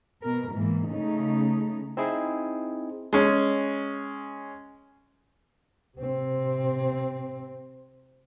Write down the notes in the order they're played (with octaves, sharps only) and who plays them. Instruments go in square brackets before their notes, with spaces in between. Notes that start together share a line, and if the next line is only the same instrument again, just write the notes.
[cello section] B2 A#4
G#2 E3 A#3
C#3 A3 D#4
[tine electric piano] C4 D#4 E4 G#4
[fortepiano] G#3 C#4
[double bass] C3 C4